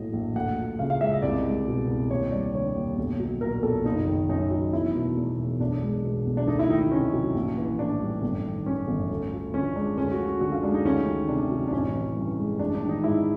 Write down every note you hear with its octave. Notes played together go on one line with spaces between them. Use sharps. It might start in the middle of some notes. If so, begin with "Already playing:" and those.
Already playing: A#1 A2 F#3 D#5
A#1
D2 F#5
F3
C#3 F5
F5
G#3 E5
D#5
C2 D5
G#3
B2
C2
D#2 C#5
G3 D5
D3 C#5
D#2
B1
F#3
A#2 A#4
B1 A4
F#1 D#4
D#3
F#2 D#4
F#3
E1 E4
B2
E2
E1
B1 D4
G#3
B2
B1
D4
D2 D#4
E4
D#3 D#4
D#4
C3 C#4
F#3
A#1
E3
A2 D4
G3
G1
D#3
F#2 C#4
G1
D2
F3
D3 C#4
G#3 D4
D2 C#4
F#4
F3
F#4
D3 F#4
F4
G#3 D4
D#4
D2 C#4
D#3
C3 D4
F#3
D4
A1 C#4
E3
G2
G#3
A1 D4
D4
D#3
D#4
G#2 E4